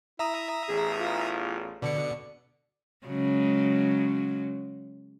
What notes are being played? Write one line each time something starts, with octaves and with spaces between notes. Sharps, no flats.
E4 E5 A#5 D#6
A1 E2 G#4
F4
B2 D3 D5 C#7
C#3 F#3 G#3